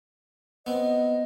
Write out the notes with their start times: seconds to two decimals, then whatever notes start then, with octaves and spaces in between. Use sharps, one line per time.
0.66 B3 C4 D#5